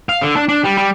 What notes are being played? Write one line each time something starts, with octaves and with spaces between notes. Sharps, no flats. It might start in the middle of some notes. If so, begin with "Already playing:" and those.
F5
D3
D4
D4
G3
G3